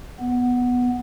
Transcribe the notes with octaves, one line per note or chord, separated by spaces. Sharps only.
B3